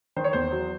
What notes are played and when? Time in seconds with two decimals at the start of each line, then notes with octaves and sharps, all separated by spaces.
0.16 D#3 C5
0.24 C#5
0.33 E2 C5
0.52 F#3